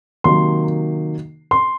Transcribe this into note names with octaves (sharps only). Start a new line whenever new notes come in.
C3 D#3 F#3 A#3 D#4 C6
C6